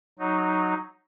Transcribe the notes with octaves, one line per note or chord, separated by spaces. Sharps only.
F#3 D#4